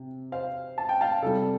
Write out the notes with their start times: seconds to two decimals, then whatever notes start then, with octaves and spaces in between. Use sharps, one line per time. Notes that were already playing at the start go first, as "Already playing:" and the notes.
Already playing: C3
0.32 C5 F5
0.78 A5
0.89 G5
1.01 F5 A5
1.22 C3 G3 A4